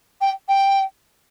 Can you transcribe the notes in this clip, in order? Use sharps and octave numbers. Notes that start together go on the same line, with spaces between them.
G5
G5